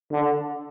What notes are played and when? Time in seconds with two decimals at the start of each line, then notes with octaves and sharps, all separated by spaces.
0.12 D3